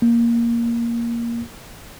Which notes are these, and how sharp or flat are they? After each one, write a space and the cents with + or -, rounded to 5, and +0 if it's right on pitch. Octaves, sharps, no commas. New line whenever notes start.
A#3 +5